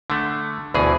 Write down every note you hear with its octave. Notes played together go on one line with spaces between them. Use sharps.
D3 A3
D2 B2 E3 G#4